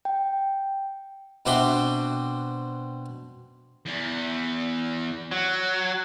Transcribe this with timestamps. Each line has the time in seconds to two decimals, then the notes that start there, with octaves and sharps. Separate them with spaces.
0.05 G5
1.46 B2 C4 D4 F#4 E5 C6
3.86 E2 E3
5.31 F#3